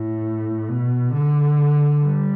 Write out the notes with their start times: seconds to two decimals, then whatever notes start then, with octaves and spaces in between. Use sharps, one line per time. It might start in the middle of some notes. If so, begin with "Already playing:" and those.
Already playing: A2
0.69 B2
1.14 D3
2.03 G3